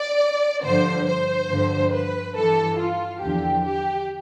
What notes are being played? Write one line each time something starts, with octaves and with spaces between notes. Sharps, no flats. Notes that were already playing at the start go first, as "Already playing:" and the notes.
Already playing: D5
G2 D3 F3 C5
C5
G2 D3 F3
B4
G2 E3 A4
F4
E2 D3 F3 G4
G4